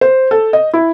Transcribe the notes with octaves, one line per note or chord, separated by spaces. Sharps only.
C5
A4
D#5
E4